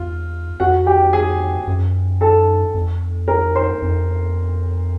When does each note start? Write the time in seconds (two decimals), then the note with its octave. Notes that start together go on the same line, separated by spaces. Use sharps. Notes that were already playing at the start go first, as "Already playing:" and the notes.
Already playing: E2 F4
0.60 F2 F#4 F#5
0.86 G4 G5
1.13 G#4 G#5
1.68 F#2
2.21 A4 A5
2.75 F2
3.28 A#4 A#5
3.55 C5 C6
3.82 F2